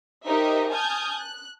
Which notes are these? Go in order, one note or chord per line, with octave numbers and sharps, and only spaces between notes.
D#4 G4 A#4 C5 D#5 E5
G#5 A5 D#6 F6 G6 G#6
F#6